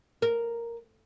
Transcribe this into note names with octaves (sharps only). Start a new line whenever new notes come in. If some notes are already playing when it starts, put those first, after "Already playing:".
A#4